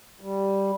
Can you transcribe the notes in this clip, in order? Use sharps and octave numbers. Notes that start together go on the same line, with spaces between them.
G3